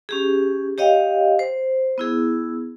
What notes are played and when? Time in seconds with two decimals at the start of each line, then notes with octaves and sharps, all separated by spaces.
0.09 C#4 G4 G#4
0.78 G4 C#5 D#5 F5 G5
1.39 C5
1.98 B3 E4 G#4